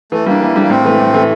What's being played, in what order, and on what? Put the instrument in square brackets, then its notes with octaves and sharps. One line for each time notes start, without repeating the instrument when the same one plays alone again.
[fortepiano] E3 [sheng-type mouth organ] A3
[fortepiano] G3 D4 [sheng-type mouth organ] A#3
[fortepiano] E3
G3 D4
[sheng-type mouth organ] A#3
[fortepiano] A2 [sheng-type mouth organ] C4
[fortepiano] E3 A3
A2
E3 A3